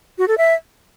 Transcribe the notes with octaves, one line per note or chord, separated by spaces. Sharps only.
F#4
A4
E5